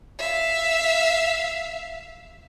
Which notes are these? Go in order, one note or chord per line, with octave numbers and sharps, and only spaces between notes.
E5 F5